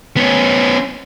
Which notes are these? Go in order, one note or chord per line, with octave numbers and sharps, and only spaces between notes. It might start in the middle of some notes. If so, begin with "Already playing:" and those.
B3 C#4